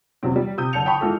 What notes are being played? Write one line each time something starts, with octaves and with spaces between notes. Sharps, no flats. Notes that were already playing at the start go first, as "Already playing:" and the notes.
E2 C3 F#3 C4
G3
C3 D#6 G6 D#7
F#1 D3 A5 G6 C#7 F7
G5 A5 B5 C#6
E3 G#3 F4 A4